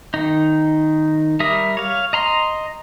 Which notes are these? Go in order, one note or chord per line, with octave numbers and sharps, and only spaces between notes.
D#3 D#4
G3 A#4 E5 D#6
C#5 F5
D#5 A#5 C6